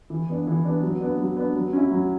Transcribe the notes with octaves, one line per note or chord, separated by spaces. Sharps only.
E3
B3 D4
E3
B3 D4
F#3
B3 D4
F#3
B3 D4
F#3
C#4 E4
F#3